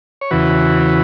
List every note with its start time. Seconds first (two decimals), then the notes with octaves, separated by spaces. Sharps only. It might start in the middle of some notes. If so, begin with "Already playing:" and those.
0.21 C#5
0.31 E2 C#3 E3 F#4 B4